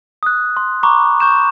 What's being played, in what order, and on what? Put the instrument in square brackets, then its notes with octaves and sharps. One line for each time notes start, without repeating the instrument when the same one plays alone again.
[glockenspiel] D#6 F#6
C6
A#5 B5 C#6 D6
C#6 G6 E7